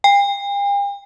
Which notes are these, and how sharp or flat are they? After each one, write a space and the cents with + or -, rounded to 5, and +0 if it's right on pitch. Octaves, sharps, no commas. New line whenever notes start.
G5 +45